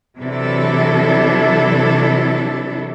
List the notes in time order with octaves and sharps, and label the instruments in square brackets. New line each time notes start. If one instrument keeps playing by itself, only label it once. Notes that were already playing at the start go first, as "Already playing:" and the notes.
[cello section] C3 E3 F#3 D4 E4 A4